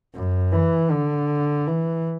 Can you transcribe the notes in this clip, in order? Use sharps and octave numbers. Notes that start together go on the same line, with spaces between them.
F#2
E3
D3
E3